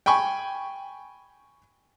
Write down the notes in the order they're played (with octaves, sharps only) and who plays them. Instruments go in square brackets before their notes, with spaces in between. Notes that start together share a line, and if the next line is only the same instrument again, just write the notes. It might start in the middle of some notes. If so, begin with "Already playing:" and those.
[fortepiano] G5 G#5 B5 C#6